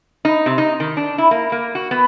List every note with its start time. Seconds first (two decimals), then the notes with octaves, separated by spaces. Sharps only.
0.25 D#4
0.46 C3
0.58 D#4
0.80 D#3
0.97 D4
1.18 E4
1.31 A#3
1.52 A#3
1.75 F#4
1.91 B3